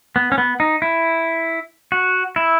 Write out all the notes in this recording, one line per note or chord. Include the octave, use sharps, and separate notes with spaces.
B3
C#4
B3
D#4
E4
F#4
E4